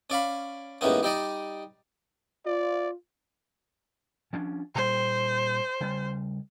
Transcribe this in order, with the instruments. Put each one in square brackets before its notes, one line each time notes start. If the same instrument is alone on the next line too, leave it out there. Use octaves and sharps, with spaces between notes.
[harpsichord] C#4 D5 F5 B5
D#2 G#2 D#3 E3 B3 C#4
G3 D#4 D5 D#5
[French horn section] F4 [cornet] D5
[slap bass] F3 C#4 D4
[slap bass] A#2 G3 [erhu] C5
[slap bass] C#3 G3